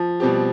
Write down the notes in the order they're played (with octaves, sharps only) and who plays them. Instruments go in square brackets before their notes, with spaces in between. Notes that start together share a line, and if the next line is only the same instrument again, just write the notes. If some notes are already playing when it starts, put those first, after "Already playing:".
Already playing: [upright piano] F3
[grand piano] B2 G3 C4 G4